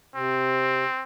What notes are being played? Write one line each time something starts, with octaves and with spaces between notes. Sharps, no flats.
C3 C4